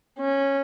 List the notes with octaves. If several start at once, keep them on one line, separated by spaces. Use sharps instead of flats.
C#4